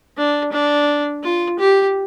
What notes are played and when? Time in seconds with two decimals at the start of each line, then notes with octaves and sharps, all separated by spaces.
0.17 D4
0.52 D4
1.23 F4
1.59 G4